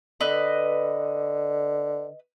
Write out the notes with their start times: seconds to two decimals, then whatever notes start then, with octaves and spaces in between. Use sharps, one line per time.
0.21 D3 B4 D#5